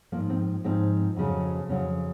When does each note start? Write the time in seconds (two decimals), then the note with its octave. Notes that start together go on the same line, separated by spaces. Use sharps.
0.12 F3 A#3
0.16 G#2
0.30 C4
0.64 G#2 F3 C4
1.16 F2 C#3 F#3
1.69 F2 C#3 F#3 C#4